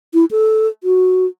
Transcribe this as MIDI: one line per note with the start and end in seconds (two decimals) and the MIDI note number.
0.14 0.25 64
0.31 0.67 69
0.84 1.26 66